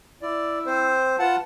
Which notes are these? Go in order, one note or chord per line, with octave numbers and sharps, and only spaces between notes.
E4 D5
C4 C5
F4 B4 F#5 A5